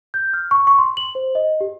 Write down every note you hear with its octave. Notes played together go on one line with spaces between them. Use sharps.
G6
F6
C#6
C#6
C6
F#7
C5
D#5
G4